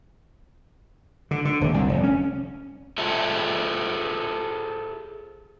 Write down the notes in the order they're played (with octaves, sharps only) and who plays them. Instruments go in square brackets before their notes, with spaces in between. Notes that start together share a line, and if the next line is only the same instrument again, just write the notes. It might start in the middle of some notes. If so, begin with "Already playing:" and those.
[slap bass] D3
D3
D#1
C2
F1
C#4
[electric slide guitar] F4 G#4 A4 C5 E5